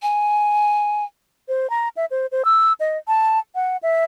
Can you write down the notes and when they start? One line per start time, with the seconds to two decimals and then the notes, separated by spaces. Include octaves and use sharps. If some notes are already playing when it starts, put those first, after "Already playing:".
0.02 G#5
1.48 C5
1.70 A#5
1.97 E5
2.11 C5
2.32 C5
2.45 E6
2.80 D#5
3.08 A5
3.55 F#5
3.83 E5